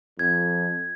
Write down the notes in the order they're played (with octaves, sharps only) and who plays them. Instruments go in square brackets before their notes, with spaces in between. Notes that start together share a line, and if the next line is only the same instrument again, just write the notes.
[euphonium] F2 [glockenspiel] G#6